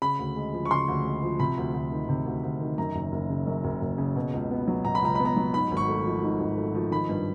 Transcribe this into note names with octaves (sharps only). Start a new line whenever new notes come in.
C#3 B5
D2
G#3
F3
C#6
C#3 C6
D2
G#3
F3
C3 B5
D2
D2
D#3
C3
D2
D2
D#3
F#2 A#5
F#1
F#1
C#3
F#2
F#1
F#1
C#3
B2
C#2
B3
F#3
B2 A#5
B5
C#2 A#5
B3 B5
A#5
F#3
G#2 B5
G#1
C#6
A3
F3
G#2
G#1
A3
F3
D#3 B5
G2